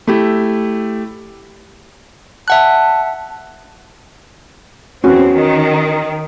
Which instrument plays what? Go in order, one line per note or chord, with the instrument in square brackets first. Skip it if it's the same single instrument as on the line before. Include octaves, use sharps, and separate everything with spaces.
[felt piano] A3 E4 G4
[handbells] E5 F#5 F#6 [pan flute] A5
[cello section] E2 C4 [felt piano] C#4 F#4
[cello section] D#3